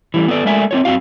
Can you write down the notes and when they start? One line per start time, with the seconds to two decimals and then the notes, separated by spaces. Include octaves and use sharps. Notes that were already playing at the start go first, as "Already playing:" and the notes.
0.14 E3 G3 A3
0.28 B3 A4 B4 D5
0.45 G#3 A3 A#4 D5 E5 G#5
0.71 C4 F4 C#5
0.85 F#2 F#3 C4 F4 F#4 F5